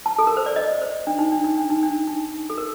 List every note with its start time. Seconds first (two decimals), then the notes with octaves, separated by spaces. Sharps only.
0.06 A5
0.19 A4
0.27 A#4
0.37 C5
0.46 D5
0.56 D#5
0.82 C5
1.07 D4
1.19 D#4
1.32 D4
1.44 D#4
1.58 D4
1.70 D#4
1.83 D4
2.07 D#4
2.50 A4
2.58 A#4